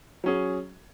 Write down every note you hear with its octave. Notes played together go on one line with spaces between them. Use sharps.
F#3 C#4 G#4